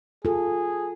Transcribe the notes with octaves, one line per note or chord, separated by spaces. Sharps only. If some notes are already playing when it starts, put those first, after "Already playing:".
F4 G#4 A4